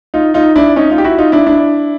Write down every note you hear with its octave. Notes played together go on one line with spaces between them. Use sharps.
D#4 F4
D#4 F4
D4 E4
C#4 D#4
D#4 F4
G4
E4 F#4
D#4 F4
D4 E4
D4 E4